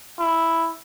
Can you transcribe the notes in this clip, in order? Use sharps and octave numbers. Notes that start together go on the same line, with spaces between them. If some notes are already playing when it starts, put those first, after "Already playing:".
E4